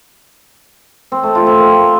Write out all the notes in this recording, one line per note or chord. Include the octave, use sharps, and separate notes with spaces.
C4
A3
F4
C4
A#3